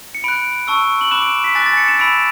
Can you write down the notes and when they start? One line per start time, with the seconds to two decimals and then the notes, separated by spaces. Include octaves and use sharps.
0.15 C#7
0.24 B5 F#6 D7
0.67 A5 C#6 E6
1.01 F#7
1.11 B5 D6 F#6 E7
1.22 D7
1.44 B6
1.55 G#5 D6 F#6 A6
1.66 A6
1.77 C#7
1.88 E7
1.99 B5 E6 D7